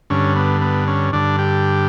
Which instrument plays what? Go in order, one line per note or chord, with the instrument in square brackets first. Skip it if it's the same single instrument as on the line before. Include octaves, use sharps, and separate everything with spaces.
[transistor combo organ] G2 D3 C#4
B3
B3
C#4
G2 D3 D4
G4